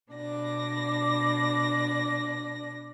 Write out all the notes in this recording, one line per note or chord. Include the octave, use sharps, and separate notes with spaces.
B2 D4 D5 A#6